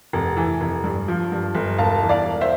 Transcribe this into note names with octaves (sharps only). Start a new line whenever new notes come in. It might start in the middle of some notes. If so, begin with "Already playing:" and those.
F1
E3
F1
G2
F3
G2
G1
E1 F5 A5
E3
D5 F5
E1
C5 E5